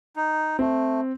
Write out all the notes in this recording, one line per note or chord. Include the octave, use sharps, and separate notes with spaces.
D#4
A3 C4